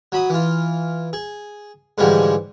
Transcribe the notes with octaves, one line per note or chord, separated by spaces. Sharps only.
F#3 B5 D#6
E3 F4
G#4
G#2 D3 E3 F3 G3 G#3